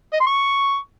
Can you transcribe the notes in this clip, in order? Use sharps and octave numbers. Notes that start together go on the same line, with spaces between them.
D#5
C6
C#6